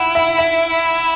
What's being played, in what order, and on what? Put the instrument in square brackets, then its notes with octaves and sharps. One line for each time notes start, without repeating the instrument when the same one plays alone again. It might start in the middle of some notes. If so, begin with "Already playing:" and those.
Already playing: [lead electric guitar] E4 [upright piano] F#5
[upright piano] E5
E5